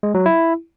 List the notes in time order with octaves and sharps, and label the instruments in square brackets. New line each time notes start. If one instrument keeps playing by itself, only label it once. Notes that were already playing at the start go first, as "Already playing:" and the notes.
[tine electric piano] G#3
F#3
E4